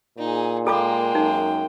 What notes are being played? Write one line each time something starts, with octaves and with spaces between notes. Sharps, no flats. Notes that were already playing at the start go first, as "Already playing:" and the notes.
A#2 D#4 G#4
G#3 A#3 A4 G5 B5 D6
F#2 D#4